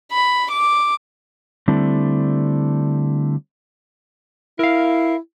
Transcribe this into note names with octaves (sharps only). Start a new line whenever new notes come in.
B5
D6
D3 G3 A3 C4 D4 E4
E4 A#4 F5